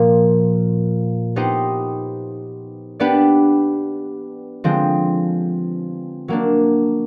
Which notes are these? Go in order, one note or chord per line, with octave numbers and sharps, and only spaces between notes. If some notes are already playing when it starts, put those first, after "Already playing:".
Already playing: A#2 F3 A#3
B3 D#4 G4 C5 D#5
B3 D4 G4 B4 D5
D3 F3 G#3 C4
F#3 A#3 D4